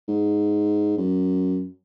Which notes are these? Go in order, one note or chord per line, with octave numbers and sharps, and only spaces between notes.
G#2
F#2